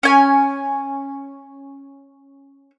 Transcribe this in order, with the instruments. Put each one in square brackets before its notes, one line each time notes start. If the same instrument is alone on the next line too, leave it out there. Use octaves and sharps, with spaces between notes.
[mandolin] C#4 G#5